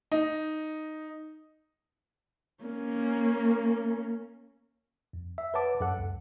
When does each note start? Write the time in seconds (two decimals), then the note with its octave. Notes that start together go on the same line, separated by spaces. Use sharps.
0.12 D#4
2.64 A#3 C#4
5.13 F2
5.38 E5
5.54 B4 C#5 F#5 A5 D6
5.80 F#2 A4 F#5
5.98 C#2